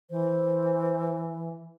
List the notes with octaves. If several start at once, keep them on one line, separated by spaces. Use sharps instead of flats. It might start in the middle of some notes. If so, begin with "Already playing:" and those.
E3 C5